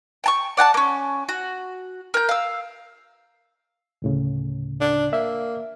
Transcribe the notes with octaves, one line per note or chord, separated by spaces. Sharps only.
G5 A5 C#6
D5 F#5 G5 A5
A#3 C#4
F#4
A#4 G6
F5 E6
D2 A2 C#3
D4
A#3 E5